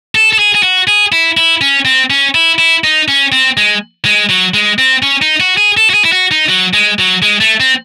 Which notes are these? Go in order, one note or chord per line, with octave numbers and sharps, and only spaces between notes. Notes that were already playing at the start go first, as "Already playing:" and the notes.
A4
A4
G#4
G#4
F#4
G#4
E4
E4
C#4
C4
C#4
E4
E4
D#4
C#4
C4
G#3
G#3
F#3
G#3
C4
C#4
D#4
F#4
G#4
A4
F#4
G#4
E4
F#4
D#4
F#3
G#3
F#3
G#3
A3
C4